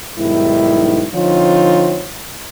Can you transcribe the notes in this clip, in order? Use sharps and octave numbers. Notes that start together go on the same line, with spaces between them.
B1 G#2 D#3 G3 E4
D3 F3 C4 D#4 F4 C#5